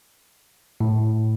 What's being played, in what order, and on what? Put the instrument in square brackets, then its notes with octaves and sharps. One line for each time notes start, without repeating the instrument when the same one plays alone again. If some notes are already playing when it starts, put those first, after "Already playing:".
[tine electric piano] A2